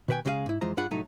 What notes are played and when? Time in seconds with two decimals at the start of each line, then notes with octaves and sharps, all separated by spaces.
0.08 B2 D#3 B4 C5 G5 G#5
0.25 C#2 C#3 G#3 G4 G#4 F5
0.46 G#2 E4
0.61 F2 E3 G#3 F4 C5 A#5
0.77 G2 D4 F4 G#4 F#5 B5
0.91 C2 A2 F#3 A3 D#4 A#5